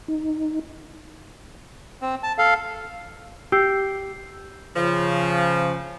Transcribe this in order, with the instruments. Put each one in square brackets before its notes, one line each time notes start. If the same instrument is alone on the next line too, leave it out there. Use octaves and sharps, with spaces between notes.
[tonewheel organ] D#4
[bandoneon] C4
A5
A4 F5
[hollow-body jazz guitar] G4 [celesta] E6 G6 C7
[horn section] C#3 F3